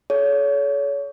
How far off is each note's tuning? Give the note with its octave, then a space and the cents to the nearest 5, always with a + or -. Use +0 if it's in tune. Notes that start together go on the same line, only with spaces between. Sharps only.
A4 -40 C#5 +30